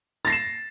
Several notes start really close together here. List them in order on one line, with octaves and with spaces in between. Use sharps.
A6 A#6 C7 E7